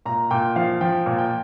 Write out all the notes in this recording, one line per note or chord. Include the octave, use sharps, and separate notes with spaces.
A#2 A#5
A#2 G5
F3 F5
F3 G5
A#2
G5